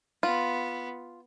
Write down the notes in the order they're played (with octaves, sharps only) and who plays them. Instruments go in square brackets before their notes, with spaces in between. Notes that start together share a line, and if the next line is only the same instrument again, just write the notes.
[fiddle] B3 [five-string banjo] F4